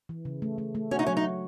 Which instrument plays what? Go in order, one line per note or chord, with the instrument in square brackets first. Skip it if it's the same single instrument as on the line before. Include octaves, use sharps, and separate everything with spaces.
[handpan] E3
C#3
A3
A3
A3
[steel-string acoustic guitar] C#4 [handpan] F#4
[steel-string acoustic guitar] D#4
[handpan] F#3 [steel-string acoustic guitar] C#4
[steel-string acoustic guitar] D#4
[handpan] F#3